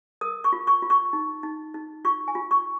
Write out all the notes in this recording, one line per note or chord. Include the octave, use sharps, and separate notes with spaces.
A#4 D#6
C#6
F4
C#6
F4
C#6
D#4
D#4
D#4
F4 C#6
G#5
F4
C#6